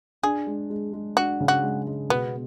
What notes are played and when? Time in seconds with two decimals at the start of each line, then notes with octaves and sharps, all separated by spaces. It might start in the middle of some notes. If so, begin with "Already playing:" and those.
0.23 D4 G#4
0.47 G#3
0.70 G#3
0.93 G#3
1.17 D4 F#4
1.41 C#3
1.48 F#4
1.63 G#3
1.87 G#3
2.09 B2 B3